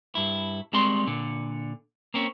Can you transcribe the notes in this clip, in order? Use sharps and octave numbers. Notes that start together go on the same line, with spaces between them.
G2 E4
G3 G#3 C4 D5 C6
A#2 D3
A#3 C4 C#4